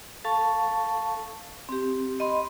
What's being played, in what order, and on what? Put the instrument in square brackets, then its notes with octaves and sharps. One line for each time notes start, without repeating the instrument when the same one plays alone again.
[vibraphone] A4 F5 A5 C#6
C4 G4
D#5 B5 C6